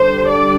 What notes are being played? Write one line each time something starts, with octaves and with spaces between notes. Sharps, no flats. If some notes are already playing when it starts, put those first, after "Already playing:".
Already playing: D3 G3 D4 C5
D5